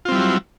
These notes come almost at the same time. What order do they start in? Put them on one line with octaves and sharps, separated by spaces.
F4 C4 G3 E4 F#3